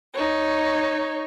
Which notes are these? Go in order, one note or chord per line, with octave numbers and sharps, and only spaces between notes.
D#4 C#5